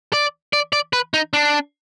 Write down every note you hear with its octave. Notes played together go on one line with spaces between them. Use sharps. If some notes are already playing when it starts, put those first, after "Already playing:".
D5
D5
D5
B4
D#4
D4